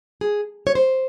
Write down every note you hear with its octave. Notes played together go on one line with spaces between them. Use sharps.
G#4
C#5
C5